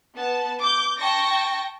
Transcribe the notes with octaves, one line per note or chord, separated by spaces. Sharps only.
B3 A5
D6 G6
G5 A5 C#6 A#6